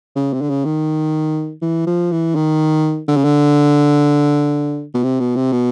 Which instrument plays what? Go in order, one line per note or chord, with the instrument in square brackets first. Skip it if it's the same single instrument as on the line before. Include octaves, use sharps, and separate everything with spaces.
[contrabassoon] C#3
C3
D3
C#3
D#3
E3
F3
E3
D#3
D3
C#3
D3
B2
C3
B2
C3
B2